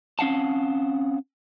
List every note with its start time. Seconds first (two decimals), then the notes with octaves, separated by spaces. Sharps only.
0.19 C4 C#4 F5 F#5 A5